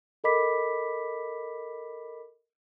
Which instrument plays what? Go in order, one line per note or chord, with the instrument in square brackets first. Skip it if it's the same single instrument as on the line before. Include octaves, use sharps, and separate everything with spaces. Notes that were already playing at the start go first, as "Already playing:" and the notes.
[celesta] A4 A#4 D#5 B5 D6 B6